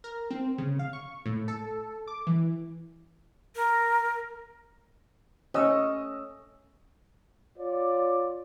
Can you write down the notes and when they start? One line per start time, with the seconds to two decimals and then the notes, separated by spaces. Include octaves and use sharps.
0.04 A#4
0.31 C4
0.58 C#3
0.79 F5
0.93 C#6
1.26 A2
1.48 A4
2.07 D6
2.27 E3
3.55 A#4
5.54 A3 C#4 D#5 D#6 E6
7.58 F4 C#5 D5